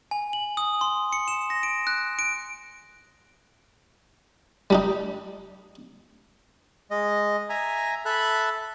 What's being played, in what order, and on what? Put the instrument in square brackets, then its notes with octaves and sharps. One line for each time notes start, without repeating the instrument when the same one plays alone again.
[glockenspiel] G#5
F#7
D#6
C6
C#7
E7
A#6
D7
F#6
D7
[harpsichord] G3 D4 D#4
[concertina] G#3 D#5
E5 G#5 A#5
A4 E5 B5 F#6